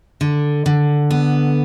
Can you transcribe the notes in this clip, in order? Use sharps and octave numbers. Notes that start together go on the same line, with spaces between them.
D3
D3
B3